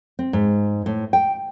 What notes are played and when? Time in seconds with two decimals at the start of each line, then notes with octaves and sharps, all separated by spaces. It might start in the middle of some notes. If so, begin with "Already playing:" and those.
0.19 C4
0.33 G#2
0.86 A2
1.13 G5